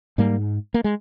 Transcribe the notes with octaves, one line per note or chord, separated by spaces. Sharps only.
G#2 G3 A#3
A#3
G#3